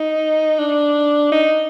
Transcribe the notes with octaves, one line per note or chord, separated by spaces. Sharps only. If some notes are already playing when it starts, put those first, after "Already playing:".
Already playing: D#4
D4
D#4